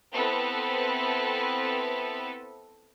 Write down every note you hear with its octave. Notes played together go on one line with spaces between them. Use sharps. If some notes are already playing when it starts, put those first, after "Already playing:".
B3 C4 E4 A4 B4